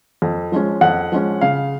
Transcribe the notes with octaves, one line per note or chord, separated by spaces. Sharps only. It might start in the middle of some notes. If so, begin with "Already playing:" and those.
F2
F3 G#3 C#4
F2 F#5
F3 G#3 C#4
C#3 F5